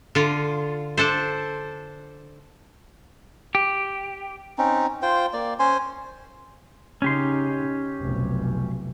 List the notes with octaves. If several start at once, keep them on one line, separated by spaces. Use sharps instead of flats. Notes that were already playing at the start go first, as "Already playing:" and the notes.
D3 F4
D4 A4 C5
G4
C4 C#4 D#4
F4 C5 G5
A#3 D5
C#4 C5 G#5 C6
C#3 C#4 D#4 G4 C6
F1 B1